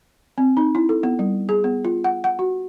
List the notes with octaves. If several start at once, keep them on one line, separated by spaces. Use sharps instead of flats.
C4
D#4
E4
A4
B3
G3
G#4
B3
F4
F#5
F#5
F#4